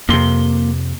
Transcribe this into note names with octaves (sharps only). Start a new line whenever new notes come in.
F2 C3 A#3 C6